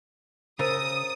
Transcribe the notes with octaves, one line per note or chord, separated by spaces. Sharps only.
C#3 A#4 C5 D#6 E6 A6